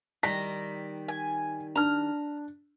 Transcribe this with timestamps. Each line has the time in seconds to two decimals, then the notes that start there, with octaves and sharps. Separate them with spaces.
0.23 D#3 G3 A#5 B6
1.08 G#5
1.76 D4 A#5 F6